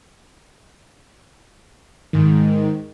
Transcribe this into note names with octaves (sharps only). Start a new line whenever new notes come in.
G#2 D#3